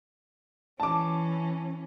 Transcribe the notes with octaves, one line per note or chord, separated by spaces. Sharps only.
E3 C#4 A5 D6